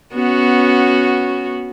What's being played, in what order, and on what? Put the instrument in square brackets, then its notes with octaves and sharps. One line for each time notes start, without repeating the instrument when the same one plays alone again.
[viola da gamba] B3 C#4 F#4